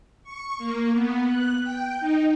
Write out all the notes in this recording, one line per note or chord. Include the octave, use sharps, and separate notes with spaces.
C#6
A#3
B3
F#6
G5
D#4